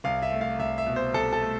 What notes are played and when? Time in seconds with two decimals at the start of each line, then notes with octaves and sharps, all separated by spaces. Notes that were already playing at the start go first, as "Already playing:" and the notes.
0.04 C2 F5
0.22 E5
0.32 A3
0.41 F5
0.59 C2 E5
0.78 E5
0.86 B2
0.96 C5
1.14 C2 A4
1.33 A4
1.42 A3